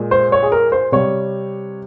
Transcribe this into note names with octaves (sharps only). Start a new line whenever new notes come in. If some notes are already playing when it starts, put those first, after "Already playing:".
Already playing: A#2 G#3
C5
C#5
G#4
A#4
C5
C3 G3 C#5